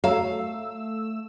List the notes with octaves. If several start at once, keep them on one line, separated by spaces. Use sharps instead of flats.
A3 F#4 C#5 F5 A#5 E6